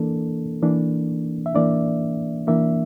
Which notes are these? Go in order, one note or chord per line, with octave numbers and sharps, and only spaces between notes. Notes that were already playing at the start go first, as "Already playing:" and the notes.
Already playing: E3 A#3 D4 A4
E3 A#3 D4
E5
E3 A#3 D4 D5
E3 A#3 D4 E5